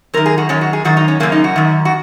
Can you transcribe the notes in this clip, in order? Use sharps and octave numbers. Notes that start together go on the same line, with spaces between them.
F#2 D#3 A#4
G#4
F#4
F#2 D#3 C#4
F#4
G#4
F#2 D#3 F#4
D#4
C#4
F#2 C#3 A#3
D#4
F#4
F#2 D#3
F#4